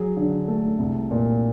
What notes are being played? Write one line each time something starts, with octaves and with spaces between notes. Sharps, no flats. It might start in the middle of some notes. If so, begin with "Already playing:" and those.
Already playing: F#3 G#4
D3
A3
C2
A#2